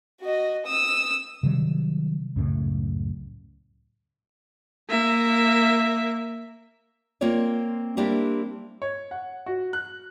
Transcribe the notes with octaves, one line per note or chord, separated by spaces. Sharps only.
F#4 D#5
D#6 E6
C3 D#3 F#3 G3
C#2 F#2 A2 C#3
A#3 E5
A#3 C4 F4 C#5 D5
G3 A#3 C4 D4 E4 G4
C#5
F#5
F#4
F#6